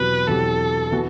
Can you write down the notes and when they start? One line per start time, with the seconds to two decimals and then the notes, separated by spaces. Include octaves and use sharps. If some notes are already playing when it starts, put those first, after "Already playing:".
Already playing: E2 B2 F#3 C4 G4 B4
0.27 E2 B2 F#3 C4 G4 A4
0.92 E3 B3 F#4